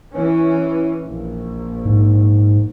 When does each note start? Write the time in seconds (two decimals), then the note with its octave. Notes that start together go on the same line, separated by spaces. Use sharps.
0.13 E3 C#4
1.05 A#1
1.85 G#2